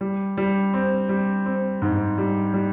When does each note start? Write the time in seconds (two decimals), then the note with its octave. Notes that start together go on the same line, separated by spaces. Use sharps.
0.01 G3
0.37 G3
0.74 C4
1.09 G3
1.46 C4
1.82 G#2
2.18 G3
2.54 G3